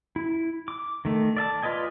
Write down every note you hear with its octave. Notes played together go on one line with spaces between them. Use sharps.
E4
D6
D#3 A3
D5 E5 A5
F4 B4 D5 D#5 G#5